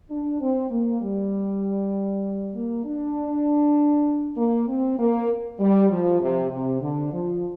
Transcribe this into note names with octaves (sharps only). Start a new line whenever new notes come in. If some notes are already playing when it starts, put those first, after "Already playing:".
D4
C4
A#3
G3
A#3
D4
A#3
C4
A#3
G3
F3
C3
C3
D3
F3